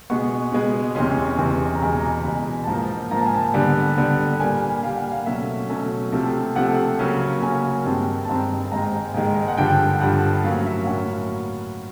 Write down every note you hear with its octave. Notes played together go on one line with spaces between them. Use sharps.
B2 G#3 B3 C#6
B2 G#3 B3
E2 C3 E3 G#3 C#4 C6
E2 C3 E3 G#3 C#4
A#5
E2 B2 G#3 B5
A#5
B5
A#5
E2 B2 G#3 B5
A5
G#2 F3 A#3 A#5
G#2 F3 A#3 A#5
A5
G#5
A5
D3 G3 B3
D3 G3 B3
A#2 G3 A#3 G#5
A#2 G3 A#3 F5
F#5
F5
B2 F#3 A3 C#4 E5
B2 F#3 A3 C#4
C3 F3 A3
C3 F3 A3 F#5
C#3 F#3 A#3 C#4
C#3 F#3 A#3 C#4 G#5
G2 D#3 G#3 C4 A5
A5
G2 D#3 G#3 C4 A#5
G#2 D#3 G#3 A#5
G#2 D#3 G#3
F#5
G2 D3 F3 G5
G2 D3 F3 F#5
A2 F#3 A#3 C#4 F5
E5
F5
A2 F#3 A#3 C#4 F#5